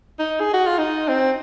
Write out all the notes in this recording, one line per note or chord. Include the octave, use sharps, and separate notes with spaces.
D#4
G#4
F#4
F4
D#4
C4